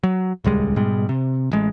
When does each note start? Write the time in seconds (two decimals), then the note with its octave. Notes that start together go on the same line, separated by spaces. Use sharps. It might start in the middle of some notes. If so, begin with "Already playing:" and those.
0.03 F#3
0.44 D#1 C#2 G3 G#3
0.76 G#2 B2 G3 G#3
1.09 C3
1.52 A1 G#3